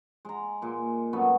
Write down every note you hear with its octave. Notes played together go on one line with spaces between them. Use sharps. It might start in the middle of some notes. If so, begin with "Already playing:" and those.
G#3 A#5
A#2 G#3
F#2 A3 B3